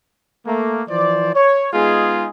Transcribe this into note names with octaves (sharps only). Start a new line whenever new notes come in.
A3 A#3
E3 F3 C5 D5
C#5
G#3 B3 D#4 F4 G#4